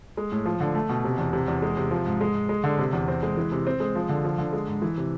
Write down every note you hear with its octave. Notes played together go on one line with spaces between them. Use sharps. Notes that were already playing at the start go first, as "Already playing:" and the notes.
G#3
A2
F3
D3
A3
B2
C3
E2
C3
E2
G#3
C3
F3
G#2
G#3
G#2
G#3
D3
C3
E2
C4
G#3
E3
C3
C4
G#3
F3
D3
F3
D3
G#3
G#2
E3
C3